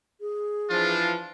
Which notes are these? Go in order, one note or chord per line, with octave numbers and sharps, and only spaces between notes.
G#4
E3 F3 D4 F4